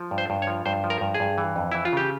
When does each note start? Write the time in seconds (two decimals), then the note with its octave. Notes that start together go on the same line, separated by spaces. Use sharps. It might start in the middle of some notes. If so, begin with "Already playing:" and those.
Already playing: F3
0.11 G2
0.18 C5
0.30 G2
0.42 C#5
0.47 F3
0.66 G2 C5
0.84 F3
0.90 A#4
1.01 G2
1.15 G#4
1.20 G2
1.38 E3
1.56 F2
1.72 E3 E4
1.85 F4
1.93 C#3 G4